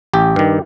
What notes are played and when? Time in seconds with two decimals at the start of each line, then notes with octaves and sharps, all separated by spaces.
0.13 A1 G4
0.36 G2 D#3